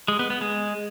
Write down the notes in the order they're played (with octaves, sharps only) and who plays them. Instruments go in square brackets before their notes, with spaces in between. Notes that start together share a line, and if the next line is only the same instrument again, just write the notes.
[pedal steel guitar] G#3
B3
B3
G#3